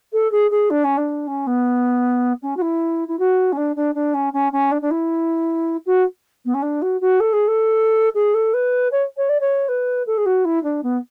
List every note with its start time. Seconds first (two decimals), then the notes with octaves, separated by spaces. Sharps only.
0.13 A4
0.31 G#4
0.51 G#4
0.70 D4
0.84 C#4
0.97 D4
1.27 C#4
1.46 B3
2.42 C#4
2.56 F#4
2.61 E4
3.08 E4
3.19 F#4
3.52 C#4
3.57 D4
3.76 D4
3.94 D4
4.14 C#4
4.33 C#4
4.52 C#4
4.71 D4
4.81 D4
4.90 E4
5.86 F#4
6.45 B3
6.54 C#4
6.62 D4
6.82 F#4
7.01 F#4
7.20 A4
7.33 G#4
7.47 A4
8.14 G#4
8.34 A4
8.53 B4
8.91 C#5
9.17 C#5
9.29 D5
9.40 C#5
9.68 B4
10.06 A4
10.17 G#4
10.25 F#4
10.44 E4
10.63 D4
10.83 B3